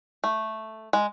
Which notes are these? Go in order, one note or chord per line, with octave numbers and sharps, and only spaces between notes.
A3
G#3